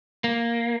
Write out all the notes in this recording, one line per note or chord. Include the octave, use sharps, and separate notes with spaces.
A#3